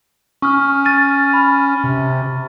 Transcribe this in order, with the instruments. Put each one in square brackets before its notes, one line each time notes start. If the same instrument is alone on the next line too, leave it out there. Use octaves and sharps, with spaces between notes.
[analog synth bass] C#4 [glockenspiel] C#6 D#6 F6
[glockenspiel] A6 D#7
B5
[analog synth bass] C3